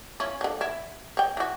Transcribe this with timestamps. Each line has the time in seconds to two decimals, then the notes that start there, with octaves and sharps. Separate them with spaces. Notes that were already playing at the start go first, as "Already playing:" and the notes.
0.20 C#4 E4 F4
0.41 D3 F3
0.61 E4
1.17 C#5 G5
1.37 E3 F#4